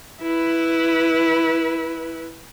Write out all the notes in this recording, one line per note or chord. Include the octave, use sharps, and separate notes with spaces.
E4 B4